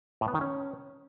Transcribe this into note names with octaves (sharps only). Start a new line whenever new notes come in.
A2
B3
D#3
C#4